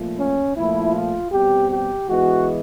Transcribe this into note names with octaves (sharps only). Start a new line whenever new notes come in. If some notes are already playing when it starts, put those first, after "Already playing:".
Already playing: A#2 F3 A3
C#4
A#2 F3 A3 E4
F4
B2 G3 C4 G4
G4
E3 G#3 B3 F#4